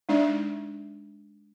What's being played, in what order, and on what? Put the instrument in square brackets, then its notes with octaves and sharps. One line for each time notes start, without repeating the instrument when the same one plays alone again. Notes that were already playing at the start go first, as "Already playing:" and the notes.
[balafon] G#3 D4 D#4 D5 E5